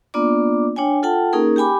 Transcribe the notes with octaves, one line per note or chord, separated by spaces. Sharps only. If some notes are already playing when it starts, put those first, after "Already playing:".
A#3 B3 D4 F4 D5 D6
D4 C#5 G5 G#5
F4 A4 F#5 G5 A5
A#3 C#4 D#4 G#4 A#4
G4 G5 G#5 B5 D6